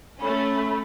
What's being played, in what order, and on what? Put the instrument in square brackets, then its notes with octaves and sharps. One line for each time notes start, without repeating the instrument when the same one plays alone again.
[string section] A3 C#4 [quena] B5